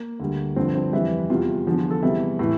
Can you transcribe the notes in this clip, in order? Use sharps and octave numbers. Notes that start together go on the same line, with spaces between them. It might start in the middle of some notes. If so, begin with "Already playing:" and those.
Already playing: A#3
D2 D3 G3
G2 D3 F3 C4
C4
F2 E3 G3 E4
E2 C3 G3 F4
E2 D3 F3
F4
A4
E2 C3 E3 G3 E4
A2 E3